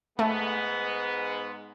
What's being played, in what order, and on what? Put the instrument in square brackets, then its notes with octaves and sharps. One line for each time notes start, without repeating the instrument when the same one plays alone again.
[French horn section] G#2 G#3 B3 [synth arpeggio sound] A3